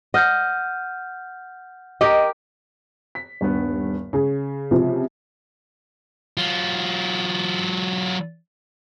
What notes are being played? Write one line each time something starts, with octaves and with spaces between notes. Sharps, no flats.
D#5 F#5 F6 G6
G4 A#4 D#5
B6
D#1 G2 B3
C#3 G#4
C3 F3
F#3 F4